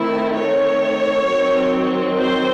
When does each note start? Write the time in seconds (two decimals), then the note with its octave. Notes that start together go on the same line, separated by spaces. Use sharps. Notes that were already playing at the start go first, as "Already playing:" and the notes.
Already playing: D#3 A3 C4 E4
0.38 C#5
1.27 D#3 F#3 C4
2.17 C5